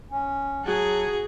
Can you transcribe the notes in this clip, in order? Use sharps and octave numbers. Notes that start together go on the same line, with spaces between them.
C#4
F#3 F#4 G#4 A5